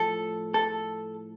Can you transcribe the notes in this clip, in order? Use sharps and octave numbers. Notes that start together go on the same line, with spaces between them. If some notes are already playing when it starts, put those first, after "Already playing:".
Already playing: A2 F3 A4
A4